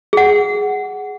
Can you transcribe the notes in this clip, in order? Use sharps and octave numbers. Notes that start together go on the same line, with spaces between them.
G#4 F#5